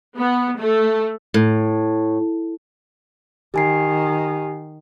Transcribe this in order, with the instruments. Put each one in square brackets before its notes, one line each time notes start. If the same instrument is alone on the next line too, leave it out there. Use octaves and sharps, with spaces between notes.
[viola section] B3
A3
[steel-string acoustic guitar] A2
[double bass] D#3 [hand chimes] G4 G#5 C7